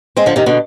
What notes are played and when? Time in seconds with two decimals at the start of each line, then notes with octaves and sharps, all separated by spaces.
0.17 G#3 C4
0.26 D3 F3
0.36 C3 D#3
0.46 B2 D3